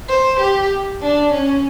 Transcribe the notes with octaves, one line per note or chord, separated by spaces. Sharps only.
C5
G4
D4
C#4